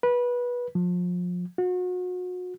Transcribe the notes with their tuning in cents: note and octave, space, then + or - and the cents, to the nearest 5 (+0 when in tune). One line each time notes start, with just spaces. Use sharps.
B4 -20
F3 +30
F#4 -35